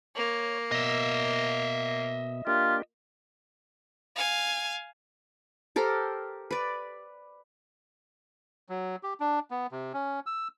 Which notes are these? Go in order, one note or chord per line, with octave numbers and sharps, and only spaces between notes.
A#3 C#5
B2 D#5 E5
A#3 D4 F4 G4
F5 G#5
G4 A4 A#4 C5
B4 D5
F#3
G4
D4
B3
C3
C#4
E6